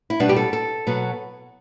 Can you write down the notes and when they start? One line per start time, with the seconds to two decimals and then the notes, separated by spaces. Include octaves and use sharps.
0.10 E4
0.20 B2 G3 B3 D4
0.29 G4
0.36 A4
0.53 A4
0.87 B2 F#3 B3